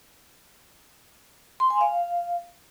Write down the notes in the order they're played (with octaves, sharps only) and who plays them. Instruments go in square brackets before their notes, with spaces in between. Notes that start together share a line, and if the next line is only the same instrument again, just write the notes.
[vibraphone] C6
G#5
F5